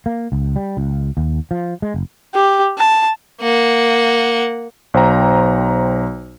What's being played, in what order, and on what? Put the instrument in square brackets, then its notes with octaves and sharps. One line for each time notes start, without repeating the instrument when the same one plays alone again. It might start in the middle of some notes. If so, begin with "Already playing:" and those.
[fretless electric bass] A#3
C#2
G3
C#2
D#2
F3
G#3
F#1
[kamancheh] G4
A5
[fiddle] A#3 F#5
[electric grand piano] B1 C5 G5 A#5